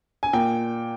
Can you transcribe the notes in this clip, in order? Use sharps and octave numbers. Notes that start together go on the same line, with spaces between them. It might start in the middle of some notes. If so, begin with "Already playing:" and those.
G#5
A#2 G5